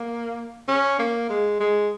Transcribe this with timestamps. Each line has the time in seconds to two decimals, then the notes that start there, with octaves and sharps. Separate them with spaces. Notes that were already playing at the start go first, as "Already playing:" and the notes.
Already playing: A#3
0.68 C#4
0.99 A#3
1.29 G#3
1.60 G#3